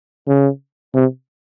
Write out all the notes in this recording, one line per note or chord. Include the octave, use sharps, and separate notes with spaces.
C#3
C3